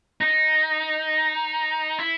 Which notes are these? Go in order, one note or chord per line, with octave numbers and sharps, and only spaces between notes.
D#4
E4